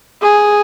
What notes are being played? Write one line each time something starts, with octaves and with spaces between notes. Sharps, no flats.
G#4